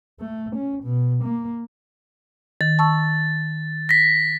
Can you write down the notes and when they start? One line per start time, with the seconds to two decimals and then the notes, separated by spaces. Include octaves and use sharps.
0.20 A3
0.56 C#4
0.84 B2
1.24 A#3
2.61 D#3 A6
2.79 A5 C#6 E6
3.89 A#6 B6